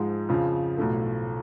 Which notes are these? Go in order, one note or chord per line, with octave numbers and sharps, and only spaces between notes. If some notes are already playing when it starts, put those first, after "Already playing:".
Already playing: G#2 F3 G#3
F2 C#3 F3
B1 A2 F3 A3